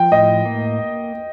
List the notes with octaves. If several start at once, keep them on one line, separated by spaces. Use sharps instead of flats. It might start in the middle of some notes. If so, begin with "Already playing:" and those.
Already playing: F3 G5
A2 D#5
A#3